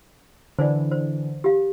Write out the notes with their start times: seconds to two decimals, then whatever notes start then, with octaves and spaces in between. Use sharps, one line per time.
0.59 D3 E3 C5 D5
0.92 C5
1.44 G4 F5